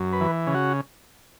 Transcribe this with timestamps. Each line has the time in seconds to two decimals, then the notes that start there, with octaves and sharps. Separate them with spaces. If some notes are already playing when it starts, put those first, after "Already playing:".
Already playing: F#2
0.13 B4
0.21 E3
0.47 C#3
0.54 F#4